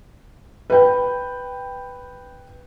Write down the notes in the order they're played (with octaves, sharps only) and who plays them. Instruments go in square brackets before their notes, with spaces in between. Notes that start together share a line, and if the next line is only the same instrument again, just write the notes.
[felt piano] B4 G5